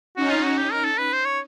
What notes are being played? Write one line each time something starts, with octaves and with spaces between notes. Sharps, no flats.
C#4 D#4 F#4
F4
F#4
G4
A#4
A4
B4
C5
C#5